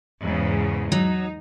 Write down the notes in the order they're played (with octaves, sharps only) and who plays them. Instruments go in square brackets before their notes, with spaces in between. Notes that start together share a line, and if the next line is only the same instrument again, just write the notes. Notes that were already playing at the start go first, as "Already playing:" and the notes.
[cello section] E2 G#2 C#3
[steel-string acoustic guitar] F#3 [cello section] D#4